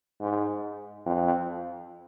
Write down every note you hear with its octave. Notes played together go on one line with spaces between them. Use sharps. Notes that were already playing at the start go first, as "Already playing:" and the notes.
G#2
F2